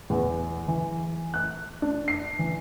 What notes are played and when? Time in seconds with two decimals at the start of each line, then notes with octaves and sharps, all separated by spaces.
0.10 E2
0.68 E3
1.34 F#6
1.82 D4
2.08 C7
2.39 E3